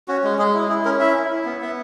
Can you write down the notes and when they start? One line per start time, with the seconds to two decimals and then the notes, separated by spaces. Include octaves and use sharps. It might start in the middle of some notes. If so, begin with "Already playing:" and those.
0.08 C#4 F#4
0.24 G#3
0.38 G#3 G#4
0.54 E4
0.69 E4 G#4
0.85 C#4 A#4
1.00 E4 E5
1.16 E4
1.30 E4
1.46 B3
1.61 B3 E5